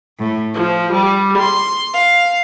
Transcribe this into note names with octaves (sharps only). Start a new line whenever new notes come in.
A2
F3
G3
C6
F5